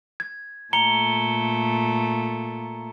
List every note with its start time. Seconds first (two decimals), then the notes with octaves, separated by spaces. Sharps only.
0.20 G#6
0.73 A#2 A3 A#5 C#7 G7